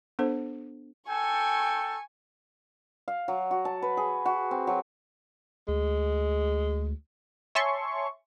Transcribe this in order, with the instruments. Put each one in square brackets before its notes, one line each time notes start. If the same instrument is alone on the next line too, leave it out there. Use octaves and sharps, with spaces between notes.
[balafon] B3 D4 A4 C5
[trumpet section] A4 G5 [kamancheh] G#5 C#6
[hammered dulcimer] F5
F#3
F#4
A5
B4
G#4
F#4
C4
F#3
[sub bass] D2 [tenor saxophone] G#3
[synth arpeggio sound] C#5 E5 G#5 A5 C6 C#6